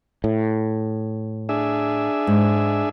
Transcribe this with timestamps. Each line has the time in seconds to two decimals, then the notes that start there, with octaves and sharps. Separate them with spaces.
0.24 A2
1.49 D4 G#4 E5
2.27 G#2